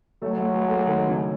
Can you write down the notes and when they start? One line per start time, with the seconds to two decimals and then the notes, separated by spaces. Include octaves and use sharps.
0.22 F#3 A3 A4
0.38 A3 A4
0.54 G#3 G#4
0.69 A3 A4
0.86 D#3 D#4
1.07 C#3 C#4